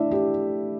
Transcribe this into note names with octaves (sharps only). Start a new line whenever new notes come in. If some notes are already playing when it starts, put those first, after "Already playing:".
Already playing: A3 D4 E4 D5 E5
G4